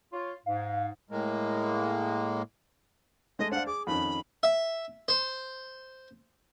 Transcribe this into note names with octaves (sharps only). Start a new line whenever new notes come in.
F4 C#5
G#2 F5
A2 G#3 A#3
G#3 A3 D#5
D4 C5 F5 F#5
G#4 D6
F2 D#3 C#4 B5
E5
C5